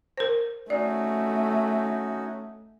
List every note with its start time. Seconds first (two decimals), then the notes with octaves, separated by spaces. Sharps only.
0.18 A#4 C5
0.70 A3 C#4 D#4 F#4 D5